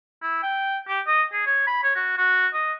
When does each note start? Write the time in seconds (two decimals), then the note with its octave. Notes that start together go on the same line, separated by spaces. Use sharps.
0.22 E4
0.43 G5
0.88 G4
1.07 D#5
1.32 G#4
1.46 C#5
1.67 B5
1.83 C#5
1.95 F#4
2.18 F#4
2.54 D#5